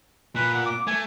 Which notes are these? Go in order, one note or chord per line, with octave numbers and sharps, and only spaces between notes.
A#2 B4
F#5
D6
A3 G#5